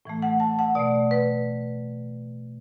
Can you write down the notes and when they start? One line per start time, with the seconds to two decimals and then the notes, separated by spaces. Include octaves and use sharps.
0.05 A2 E3 A3
0.22 F#5
0.40 A5
0.59 F#5
0.75 B2 A3 D5
1.11 B4